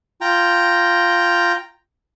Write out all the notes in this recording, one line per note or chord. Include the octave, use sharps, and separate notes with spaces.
F4 G5 A#5